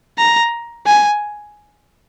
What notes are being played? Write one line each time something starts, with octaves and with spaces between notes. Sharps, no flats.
A#5
G#5